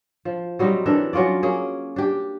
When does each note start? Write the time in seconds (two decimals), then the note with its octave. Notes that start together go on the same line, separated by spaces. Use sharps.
0.25 F3
0.59 F#3 G3 C4 D#4
0.86 E3 D4 A4 A#4
1.13 F#3 C#4 F4 D5
1.43 A#3 C#4 G#4
1.96 D4 G4